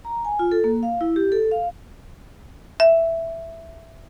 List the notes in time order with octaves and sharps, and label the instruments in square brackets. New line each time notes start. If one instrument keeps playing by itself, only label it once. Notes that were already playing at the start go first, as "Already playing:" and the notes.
[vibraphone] A#5
G#5
F4
A4
A#3
F5
E4
G4
A4
F5
[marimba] E5